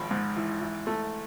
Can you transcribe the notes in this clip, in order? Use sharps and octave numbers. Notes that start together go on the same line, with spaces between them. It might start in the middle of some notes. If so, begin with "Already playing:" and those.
Already playing: G#1 F3 B5
G#2
E3
E3
A3